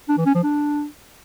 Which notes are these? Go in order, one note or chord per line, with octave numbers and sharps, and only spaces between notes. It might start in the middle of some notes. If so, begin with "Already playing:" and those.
D4
E3
C#4
F3
D4